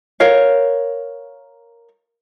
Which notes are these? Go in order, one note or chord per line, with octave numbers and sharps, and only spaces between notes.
A#4 C#5 F5